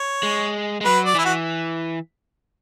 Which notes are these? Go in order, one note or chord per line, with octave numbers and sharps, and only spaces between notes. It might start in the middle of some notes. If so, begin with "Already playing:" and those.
Already playing: C#5
G#3
G#3
F#3 B4
D5
E3 E4
F#4